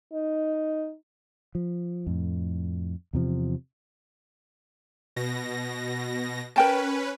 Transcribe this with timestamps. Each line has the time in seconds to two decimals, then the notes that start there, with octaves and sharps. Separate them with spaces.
0.13 D#4
1.55 F3
2.07 F2 A2
3.13 E2 C3 F3
5.16 B2 A#6
6.56 C#4 A#4 B4 G5 A5